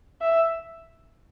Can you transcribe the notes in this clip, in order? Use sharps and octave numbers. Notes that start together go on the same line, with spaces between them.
E5